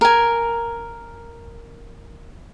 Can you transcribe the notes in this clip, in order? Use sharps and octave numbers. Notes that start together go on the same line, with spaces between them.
A#4 G#5